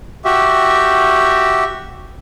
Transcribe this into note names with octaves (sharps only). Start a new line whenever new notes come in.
F#4 G4 E5